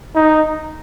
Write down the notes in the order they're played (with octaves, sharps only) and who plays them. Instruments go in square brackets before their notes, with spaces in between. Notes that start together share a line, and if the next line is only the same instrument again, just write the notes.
[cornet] D#4